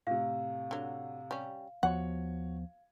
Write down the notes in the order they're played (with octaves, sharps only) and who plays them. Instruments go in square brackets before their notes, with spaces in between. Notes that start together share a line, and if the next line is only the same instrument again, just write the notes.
[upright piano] A2 C3 [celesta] F5
[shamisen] D3 F#3
G3 C#4
[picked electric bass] D#2 F3 B3 [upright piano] F#4 C#5 [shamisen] F#5